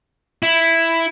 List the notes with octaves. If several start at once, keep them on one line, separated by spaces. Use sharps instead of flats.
E4